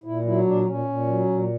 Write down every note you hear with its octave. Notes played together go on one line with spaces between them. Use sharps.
A#2 E4
F#3 E4
A#2 D4
A#2 C#4
A#2
F#3
A#2